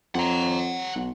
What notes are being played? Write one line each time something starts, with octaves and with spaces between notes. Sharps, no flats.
F2 F#5 A#5
B1